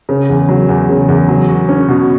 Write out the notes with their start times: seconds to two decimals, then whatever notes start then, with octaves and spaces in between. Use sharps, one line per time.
0.09 C#3
0.30 E2
0.49 F#3
0.69 E2
0.89 C#3
1.09 E2
1.28 F#3
1.49 F#4
1.69 C#4
1.88 B2